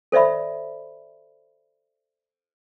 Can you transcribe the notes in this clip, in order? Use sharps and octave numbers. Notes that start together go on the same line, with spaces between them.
A4 C5 D5 E5 B5